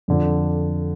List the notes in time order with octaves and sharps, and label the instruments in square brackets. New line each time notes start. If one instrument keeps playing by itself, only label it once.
[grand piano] F2 D3 F3